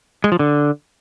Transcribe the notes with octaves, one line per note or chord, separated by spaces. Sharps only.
G#3
F3
D3